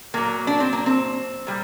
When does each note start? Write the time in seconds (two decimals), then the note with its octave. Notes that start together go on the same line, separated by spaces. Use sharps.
0.14 A#2 F#3 A#3
0.47 D4
0.60 C4
0.73 A#3
0.86 C4
1.47 A#2 G3